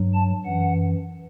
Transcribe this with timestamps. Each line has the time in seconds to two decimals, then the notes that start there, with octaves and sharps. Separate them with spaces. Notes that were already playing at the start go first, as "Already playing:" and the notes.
Already playing: G2 F#3
0.14 A5
0.45 F#2 E3 F#5